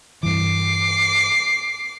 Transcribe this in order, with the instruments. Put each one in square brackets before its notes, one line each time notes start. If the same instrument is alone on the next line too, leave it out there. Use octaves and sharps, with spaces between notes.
[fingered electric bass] G2 E3 [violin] D6 C7